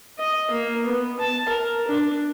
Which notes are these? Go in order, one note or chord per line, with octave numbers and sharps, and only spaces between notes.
D#5
A#3
B3
A5
A#4
D4